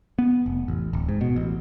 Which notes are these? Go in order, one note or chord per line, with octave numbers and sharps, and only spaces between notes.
B3
F1
A1
D1
G#2
B2
A1